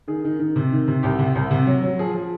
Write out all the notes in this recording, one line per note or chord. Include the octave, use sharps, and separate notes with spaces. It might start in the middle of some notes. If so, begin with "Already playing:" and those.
D#3 G#4
D#3
D#3
C3
D#3
C3
C2 G4
C3
C2
C3
F#3
F#3
F3 G#4
F3